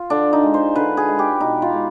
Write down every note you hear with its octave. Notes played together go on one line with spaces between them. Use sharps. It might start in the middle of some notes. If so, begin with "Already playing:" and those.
Already playing: F4
D3 D4
D#4
G#3
C5
D3 B4
G#4
G#3
G4
B2 D#4
F4
G#3